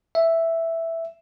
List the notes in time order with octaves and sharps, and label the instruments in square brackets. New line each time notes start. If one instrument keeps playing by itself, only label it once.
[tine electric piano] E5